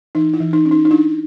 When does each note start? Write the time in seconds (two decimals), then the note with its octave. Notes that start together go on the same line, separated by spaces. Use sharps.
0.15 E3 D#4
0.34 E4
0.40 E3
0.53 D#4
0.65 C#4
0.71 D#4
0.85 D#4
0.91 D4 E4